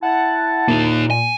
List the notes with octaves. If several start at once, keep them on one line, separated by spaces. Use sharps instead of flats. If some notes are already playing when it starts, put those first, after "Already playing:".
E4 F#5 A5
A#2 A#3 D#4
G#5